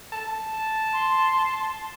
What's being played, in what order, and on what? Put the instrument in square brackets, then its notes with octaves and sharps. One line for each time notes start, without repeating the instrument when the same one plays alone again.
[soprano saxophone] A5
[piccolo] C6